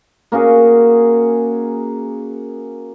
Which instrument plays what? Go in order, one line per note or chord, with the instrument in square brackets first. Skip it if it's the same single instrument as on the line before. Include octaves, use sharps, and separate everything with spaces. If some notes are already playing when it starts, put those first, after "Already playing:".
[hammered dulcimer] A#3 C#4 F#4 G#4